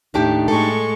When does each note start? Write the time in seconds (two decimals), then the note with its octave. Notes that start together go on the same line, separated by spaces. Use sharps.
0.14 D#2 A2 A3 D4 D#4 G4
0.48 A2 G#3 A4 C#6